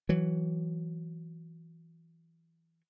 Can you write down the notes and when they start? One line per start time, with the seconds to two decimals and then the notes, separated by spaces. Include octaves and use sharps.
0.09 E3 F#3